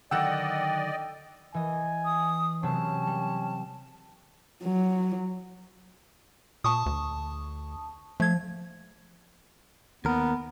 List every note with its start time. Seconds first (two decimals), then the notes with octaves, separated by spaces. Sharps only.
0.11 D3 D#3 F#3 D5 D#5 F#5 G5 E6
1.54 E3 D#5 G#5
2.05 D#6
2.63 C3 F#3 C4 C#4 A5
3.07 G3
4.63 F#3
6.64 A#2 A5 C#6 D#6
6.86 D2
8.20 F3 A3 G#6
10.05 D#2 B3 A#4